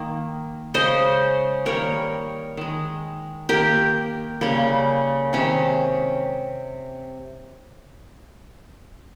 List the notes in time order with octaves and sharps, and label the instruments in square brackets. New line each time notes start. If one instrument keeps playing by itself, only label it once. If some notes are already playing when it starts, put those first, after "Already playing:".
Already playing: [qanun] D#3 A#3
C#3 G#3 C5 D#5
D#3 G3 A#3 A#4 C#5
D#3 G#3
D#3 A#3 G4 A#4
C#3 G3 A#3
C3 D#3 G#3 C#4